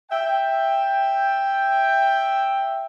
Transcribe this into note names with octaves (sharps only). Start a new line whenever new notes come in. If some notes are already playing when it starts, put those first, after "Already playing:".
E5 G5